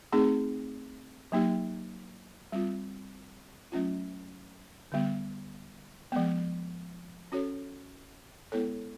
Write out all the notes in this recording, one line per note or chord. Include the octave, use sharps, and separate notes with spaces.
A3 C4 D#4 G#4
F#3 A#3 D#4 G4
G3 C4 F4
F#3 A3 C#4 F4
D3 G3 B3
F3 G#3 B3
C#4 F#4 A4 C#5
G#3 B3 E4 A4 C#5